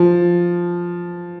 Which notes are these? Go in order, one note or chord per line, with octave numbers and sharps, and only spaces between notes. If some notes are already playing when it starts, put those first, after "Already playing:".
Already playing: F3